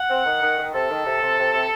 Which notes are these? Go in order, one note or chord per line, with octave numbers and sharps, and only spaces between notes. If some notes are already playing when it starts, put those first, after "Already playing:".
Already playing: F#5
C4
D#3
D#3
D#3
C3 A4
D#3
C3
C3
C3
C3